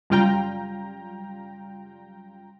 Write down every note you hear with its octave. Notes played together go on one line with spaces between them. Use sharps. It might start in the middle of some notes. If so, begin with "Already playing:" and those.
F#2 C#3 G3 F4 G5 A#5